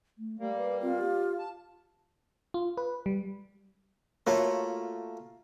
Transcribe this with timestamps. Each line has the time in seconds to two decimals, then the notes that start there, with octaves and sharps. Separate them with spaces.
0.18 A3
0.39 G3 A3 A#3
0.56 B4
0.82 C4 F4
0.98 G4
1.39 A5
2.54 F4
2.77 B4
3.06 G3
4.27 A3 A#3 F4 F#4 C#5